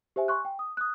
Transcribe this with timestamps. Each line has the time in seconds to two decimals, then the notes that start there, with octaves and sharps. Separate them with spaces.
0.16 G4 C5 E5 G#5
0.28 G#5 C6 C#6 F#6
0.45 G5
0.59 D#6
0.77 D#6 F#6